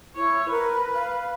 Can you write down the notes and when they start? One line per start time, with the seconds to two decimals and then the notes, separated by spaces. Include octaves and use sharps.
0.16 E4 C#5
0.51 A#4 B4
0.94 F5